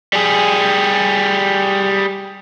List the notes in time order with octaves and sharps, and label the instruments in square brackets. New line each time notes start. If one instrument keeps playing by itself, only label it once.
[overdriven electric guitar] G3 G#4